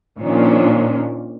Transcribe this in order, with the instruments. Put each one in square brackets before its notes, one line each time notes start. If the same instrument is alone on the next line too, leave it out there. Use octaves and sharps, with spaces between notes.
[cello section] A#2 D#3 F3 A#3 C#4 D4